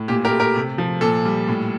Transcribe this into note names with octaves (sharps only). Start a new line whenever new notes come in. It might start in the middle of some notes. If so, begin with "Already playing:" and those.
Already playing: A2
A#2 G4
G4 A#4
A3
G4 A#4
C3
F3
A#2 A4
G3
A2